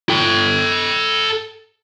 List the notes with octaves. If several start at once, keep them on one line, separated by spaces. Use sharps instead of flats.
A4 G5